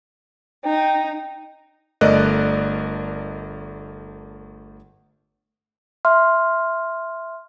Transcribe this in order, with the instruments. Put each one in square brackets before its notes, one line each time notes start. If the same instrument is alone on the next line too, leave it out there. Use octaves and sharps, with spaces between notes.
[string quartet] D#4 [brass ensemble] G5
[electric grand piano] G1 A3 A#4 D5 D#5 F#6
[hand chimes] E5 C6 F6